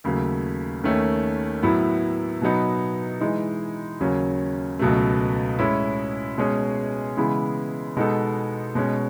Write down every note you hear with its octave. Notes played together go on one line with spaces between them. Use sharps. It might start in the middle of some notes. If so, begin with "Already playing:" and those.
D#2 C#3 F#3 A3
D#2 D#3 A3 C#4
A2 F#3 B3 E4
B2 F#3 B3 D#4
E3 G#3 D#4
D#2 C#3 F#3 C#4
C#2 B2 F#3 A3
A2 G#3 C#4 E4
B2 G#3 C#4 G#4 C#5
C#3 E3 G#3 B3 E4
B2 G#3 B3 D#4 A4
B2 G#3 C#4